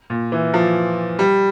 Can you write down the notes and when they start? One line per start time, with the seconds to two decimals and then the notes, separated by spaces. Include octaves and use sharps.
0.10 A#2
0.32 E3
0.54 F3
1.19 G3